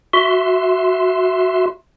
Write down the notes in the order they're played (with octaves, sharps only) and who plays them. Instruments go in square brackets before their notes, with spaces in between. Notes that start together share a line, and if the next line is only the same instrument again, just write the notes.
[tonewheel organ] F#4 E5 C6